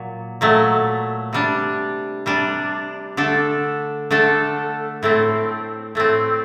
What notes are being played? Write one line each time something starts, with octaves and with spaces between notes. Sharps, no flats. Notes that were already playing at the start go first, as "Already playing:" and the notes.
Already playing: A#2 F#3
A#2 F#3 A3
C3 G3 D4
C3 G3 D4
D3 A3 D4 A4
D3 A3 D4 A4
A2 A3 C4
A2 A3 C4